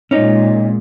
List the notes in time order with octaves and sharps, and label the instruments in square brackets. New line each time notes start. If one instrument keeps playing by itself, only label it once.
[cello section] A#2 G#3 [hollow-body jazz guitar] C#4 D#4